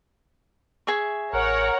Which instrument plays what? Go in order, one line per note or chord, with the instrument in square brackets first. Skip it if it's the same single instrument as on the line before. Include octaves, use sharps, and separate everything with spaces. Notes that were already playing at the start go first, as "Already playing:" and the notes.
[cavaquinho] G#4 E5 C#6
[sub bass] A1 [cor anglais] A#4 [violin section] C#5 F#5 A#5